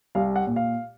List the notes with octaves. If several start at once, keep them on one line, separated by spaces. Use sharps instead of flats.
C2 F5
F#5
A#2
F5